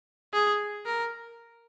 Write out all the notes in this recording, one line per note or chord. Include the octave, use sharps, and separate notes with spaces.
G#4
A#4